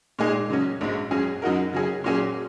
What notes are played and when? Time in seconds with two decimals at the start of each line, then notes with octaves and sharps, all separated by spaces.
0.19 A#2 G#3 D#4 G#4
0.50 C#3 F#3 C#4
0.81 A#1 G#2 G#3
1.11 F#2 F#3 C#4 G#4
1.42 F#2 F#3 D#4 F#4 A#4
1.73 C#3 F#3 C#4 G#4
2.04 A#2 F#3 C#4 G#4